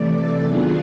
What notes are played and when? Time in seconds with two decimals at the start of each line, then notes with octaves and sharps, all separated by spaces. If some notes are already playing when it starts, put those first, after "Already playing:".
Already playing: C3 E3 A3 D5
0.16 A4
0.44 D#3 F#3 B3 D4 F4 G#4